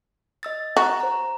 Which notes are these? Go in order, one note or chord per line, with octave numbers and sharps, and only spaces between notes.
D#5 E6 A6
F#4 A#5
C5 A#5